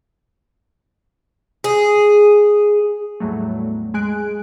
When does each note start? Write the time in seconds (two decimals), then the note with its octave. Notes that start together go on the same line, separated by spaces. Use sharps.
1.64 G#4
3.20 E2 A2 F#3 G3 A3
3.94 G#3 G#4 G#5 F#6 D7